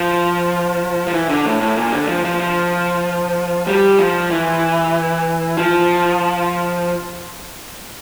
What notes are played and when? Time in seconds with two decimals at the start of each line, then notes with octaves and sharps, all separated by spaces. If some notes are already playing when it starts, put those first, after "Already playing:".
Already playing: F3
1.07 F3
1.14 E3
1.29 D3
1.45 A2
1.61 A2
1.77 A#2
1.92 D3
2.08 F3
2.24 F3
2.40 F3
3.67 G3
3.99 F3
4.31 E3
5.57 F3